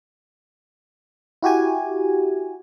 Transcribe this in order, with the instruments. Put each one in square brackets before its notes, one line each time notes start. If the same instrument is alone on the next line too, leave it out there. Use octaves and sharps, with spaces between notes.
[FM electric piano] E4 F#4 G4 G#5